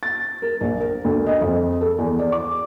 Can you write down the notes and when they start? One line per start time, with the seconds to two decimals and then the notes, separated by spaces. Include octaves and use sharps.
0.03 A6
0.42 A#4
0.61 A#1
0.80 A#4
1.04 D2
1.27 D#5
1.41 F2
1.81 A4
1.98 E2
2.19 D5
2.32 D6